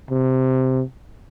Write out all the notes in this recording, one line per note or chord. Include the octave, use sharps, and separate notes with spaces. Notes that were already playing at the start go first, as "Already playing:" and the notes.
C3